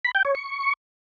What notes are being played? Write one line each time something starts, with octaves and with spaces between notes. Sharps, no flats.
B5
G5
C#5
C#6